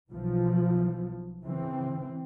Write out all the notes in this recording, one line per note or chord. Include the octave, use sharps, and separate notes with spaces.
B1 E3 F3
C#3 E3 C4